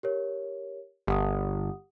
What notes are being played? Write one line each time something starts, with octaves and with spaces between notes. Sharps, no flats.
G4 A#4 C#5
G1 G4 F#5 D#6